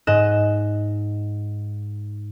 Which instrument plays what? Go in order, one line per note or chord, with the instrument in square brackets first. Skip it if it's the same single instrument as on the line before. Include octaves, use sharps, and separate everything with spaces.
[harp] G#2 D#5 F#6 E7